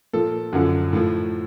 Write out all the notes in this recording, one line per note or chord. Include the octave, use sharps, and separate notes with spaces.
A#2 F3 A4
F#2 D3 F3
A2 F3